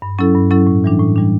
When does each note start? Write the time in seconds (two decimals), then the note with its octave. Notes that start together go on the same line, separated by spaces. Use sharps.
0.02 G2
0.19 F#3 C#4 E4 A4
0.34 G2
0.51 F#3 C#4 E4 A4
0.67 A2
0.84 E3 G3 D4
0.99 A2
1.16 E3 G3 D4